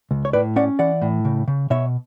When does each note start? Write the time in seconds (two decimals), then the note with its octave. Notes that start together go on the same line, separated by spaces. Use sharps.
0.11 C#2
0.25 C#5
0.33 A2 B4 D5
0.56 C#4 D5 F#5
0.79 E3 D5 F#5
1.02 A2
1.25 C#3
1.48 C#3
1.70 B2 C#5 E5